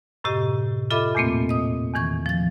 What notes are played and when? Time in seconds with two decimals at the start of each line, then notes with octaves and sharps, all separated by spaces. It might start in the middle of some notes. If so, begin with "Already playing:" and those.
0.24 F#2 A2 C3 G4 D#5
0.91 F4 A4 D#5 E5 B5 D6
1.15 E2 A#2 A3 A#3 C4
1.49 D#5 D#6
1.94 E2 D#3 E3 C#6 G#6
2.26 F3 A6